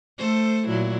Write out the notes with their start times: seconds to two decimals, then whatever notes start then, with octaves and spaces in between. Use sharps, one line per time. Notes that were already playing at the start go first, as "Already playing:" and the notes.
0.18 A3 A4 C5
0.67 A#2 F#3 E4